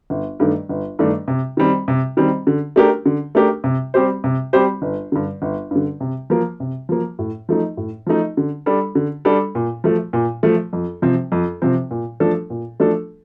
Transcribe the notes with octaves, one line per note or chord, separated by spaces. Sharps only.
G1
G2 D#3 A3 D4
G1
G2 D#3 A3 D4
C3
D#3 G3 C4
C3
D#3 G3 C4
D3
A3 D4 G4 A#4
D3
A3 D4 G4 A#4
C3
G3 C4 G4 C5
C3
G3 C4 G4 C5
G1
G2 D3
G1
G2 D3
C3
F3 A#3
C3
F3 A#3
A2
F3 A3 D#4
A2
F3 A3 D#4
D3
G3 D4 A4
D3
G3 D4 A4
A#2
F3 A3
A#2
F3 A3
F2
C3 F3 C4
F2
C3 F3 C4
A#2
F3 A3 D4 A4
A#2
F3 A3 D4 A4